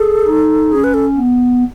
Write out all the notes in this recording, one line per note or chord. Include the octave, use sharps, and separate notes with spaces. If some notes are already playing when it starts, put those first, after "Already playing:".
Already playing: G#4 A4
D#4
C#4 G#4
B4
A4
B3